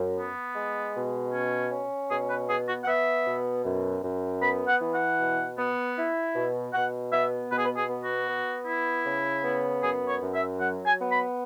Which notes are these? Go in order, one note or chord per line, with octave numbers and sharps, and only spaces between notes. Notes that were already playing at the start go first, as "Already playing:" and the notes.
Already playing: F#2
B3
G#3
B2
C#4
C#4
B2 G#4
B4
B3 G#4
F#4
F#5
B3 E5
B2
F#2
F#2
B3 B5
F#5
E3
F#5
B2
B3
E4
B2
B2 F#5
B3 E5
B2 B4
G#4
B4
G#4
B3
F#4
B3
E4
C#3
B3
F#2 G#4
C#5
F#2
E5
F#3 F#5
G#5
B3
B5